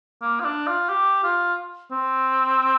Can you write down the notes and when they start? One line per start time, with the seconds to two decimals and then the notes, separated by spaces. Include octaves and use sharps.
0.22 A#3
0.40 F4
0.45 D4
0.67 F4
0.89 G4
1.24 F4
1.91 C4